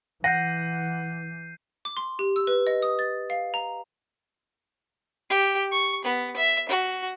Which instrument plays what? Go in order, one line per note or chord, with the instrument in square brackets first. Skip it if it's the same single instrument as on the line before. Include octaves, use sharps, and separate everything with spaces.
[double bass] E3 [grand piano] F#5 [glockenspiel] G6 C7 D#7 [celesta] A#6
[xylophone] D6
C6
G4
E6
B4
D#5
D#6
A6
F5
A#5
[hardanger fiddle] G4
C#6
B3
E5
F#4